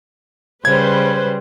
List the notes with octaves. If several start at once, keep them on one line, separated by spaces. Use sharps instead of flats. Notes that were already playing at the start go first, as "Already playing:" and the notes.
C#3 G3 B4 C5 G#6